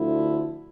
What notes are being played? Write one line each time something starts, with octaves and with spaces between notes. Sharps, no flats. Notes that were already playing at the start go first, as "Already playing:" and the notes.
Already playing: D2 D3 F3 E4